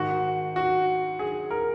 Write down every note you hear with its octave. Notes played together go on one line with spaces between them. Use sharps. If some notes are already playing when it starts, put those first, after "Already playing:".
Already playing: G#2 D#3 F#4
F#4
G#4
A#4